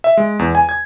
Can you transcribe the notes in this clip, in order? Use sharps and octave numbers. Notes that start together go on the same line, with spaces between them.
E5
G#3
E2
G#5
G#6